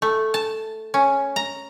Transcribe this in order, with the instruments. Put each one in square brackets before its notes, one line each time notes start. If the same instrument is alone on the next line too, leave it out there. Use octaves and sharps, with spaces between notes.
[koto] A3
A5
C#4
A#5